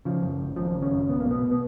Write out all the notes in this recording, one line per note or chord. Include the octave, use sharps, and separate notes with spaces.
C#3 F3
F#2
G#1
G#1 F3
C#3
C#4
F#2
B1 B3
A#3
B2
B3
B2
B3